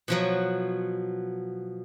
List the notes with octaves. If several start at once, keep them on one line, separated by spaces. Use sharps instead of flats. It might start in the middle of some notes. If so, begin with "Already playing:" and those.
B2 F3 F#3